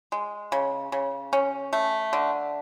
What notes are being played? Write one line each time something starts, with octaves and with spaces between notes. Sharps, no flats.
G#3
C#3
C#3
C#4
A3
D3